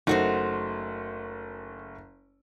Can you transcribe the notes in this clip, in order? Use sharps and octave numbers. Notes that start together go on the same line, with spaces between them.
F#1 A3 D#4 F#4 C5